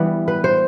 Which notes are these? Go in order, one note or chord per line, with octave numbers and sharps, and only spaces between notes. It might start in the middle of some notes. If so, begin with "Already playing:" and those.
Already playing: E3 G3 B3 B4
B4
C5